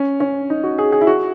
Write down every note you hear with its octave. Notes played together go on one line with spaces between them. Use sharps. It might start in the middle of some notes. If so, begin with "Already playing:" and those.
Already playing: C#4
C#4
D#4
F#4
G#4
G#4
E4
F#4